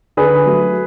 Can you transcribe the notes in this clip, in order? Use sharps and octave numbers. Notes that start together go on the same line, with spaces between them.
D3 G#4 B4
F#3 A3